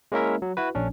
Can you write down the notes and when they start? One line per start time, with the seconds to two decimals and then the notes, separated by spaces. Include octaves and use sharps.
0.12 G#3 A#3 C#4 E4 A#4 E5
0.42 F#3
0.57 E4 F#4 B4
0.75 A#1 C#4 D4